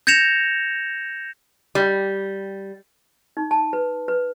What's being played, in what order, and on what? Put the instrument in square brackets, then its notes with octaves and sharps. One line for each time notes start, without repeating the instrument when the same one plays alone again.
[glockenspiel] G6 G#6 A#6 C#7 E7 F7
[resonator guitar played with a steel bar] G3
[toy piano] D#4
A5
B4
B4